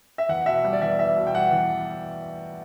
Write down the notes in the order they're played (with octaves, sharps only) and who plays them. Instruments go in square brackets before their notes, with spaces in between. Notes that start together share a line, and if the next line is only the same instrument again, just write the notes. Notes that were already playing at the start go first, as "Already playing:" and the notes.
[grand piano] E5
E2 F#5
B2 E5
G3
D5
E2 E5
E2 E5
B2
G5
G3 F#5
E2